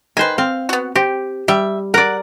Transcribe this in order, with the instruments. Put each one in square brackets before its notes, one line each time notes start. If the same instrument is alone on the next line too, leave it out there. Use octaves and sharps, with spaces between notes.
[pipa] D#3 B4 [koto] C5 G#5
[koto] C4 [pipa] F5
[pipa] B3 F#4
[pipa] C4 [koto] G4
[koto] G3 [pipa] E5
[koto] A#4 D5 [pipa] F#5